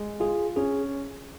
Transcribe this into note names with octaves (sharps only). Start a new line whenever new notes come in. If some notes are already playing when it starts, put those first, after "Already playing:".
Already playing: G#3
F4 G#4
C#4 G#4